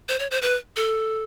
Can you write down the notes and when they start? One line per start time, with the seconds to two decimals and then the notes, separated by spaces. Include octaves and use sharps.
0.09 C5
0.20 C#5
0.31 C5
0.42 B4
0.76 A4